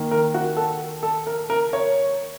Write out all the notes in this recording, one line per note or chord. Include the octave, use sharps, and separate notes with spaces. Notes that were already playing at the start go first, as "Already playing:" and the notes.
Already playing: D#3 A#3
A#4
F#4
A4
A4
A#4
A#4
C#5